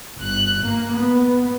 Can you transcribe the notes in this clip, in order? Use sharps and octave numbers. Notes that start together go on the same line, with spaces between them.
G1 F#6
A#3
B3